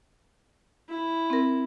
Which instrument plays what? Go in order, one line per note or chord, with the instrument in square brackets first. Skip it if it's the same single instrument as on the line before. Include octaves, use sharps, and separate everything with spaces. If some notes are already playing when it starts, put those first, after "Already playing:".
[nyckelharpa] E4
[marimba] C4 A#4